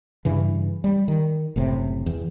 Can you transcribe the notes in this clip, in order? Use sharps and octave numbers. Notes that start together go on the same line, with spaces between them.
G2 C#3 E3
G3
D#3
F#1 A2 C3
E2